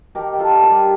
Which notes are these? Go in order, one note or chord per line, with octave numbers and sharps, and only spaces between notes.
D#3 G4 A#4
D#3
F4 A4
D4
G4 A#4
G3